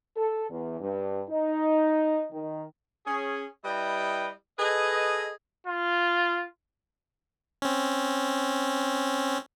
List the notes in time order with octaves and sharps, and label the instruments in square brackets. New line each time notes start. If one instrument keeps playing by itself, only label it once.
[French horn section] A4
E2
G2
D#4
D#3
[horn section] C#4 G#4
G3 E4 B4 D#5 G5
G#4 A4 B4 D#5
[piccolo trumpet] F4
[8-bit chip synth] C4 C#4